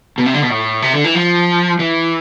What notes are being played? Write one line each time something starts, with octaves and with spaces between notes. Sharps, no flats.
B2
C3
D3
B2
A2
C3
D3
E3
F3
E3